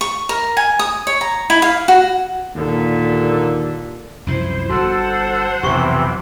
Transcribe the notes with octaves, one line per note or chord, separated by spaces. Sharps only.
C#6
A#4
G#5
D#6
C#5
A#5
E4
F5
F#4
D#2 A#2 D3
C2 F#2 F3 E4 C5
G1 F#4 A4 C5 F#5
B1 F2 C3 E3 C4 G4 C#6